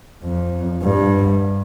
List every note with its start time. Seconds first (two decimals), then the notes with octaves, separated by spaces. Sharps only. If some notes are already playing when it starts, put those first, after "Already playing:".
0.23 F2
0.83 G2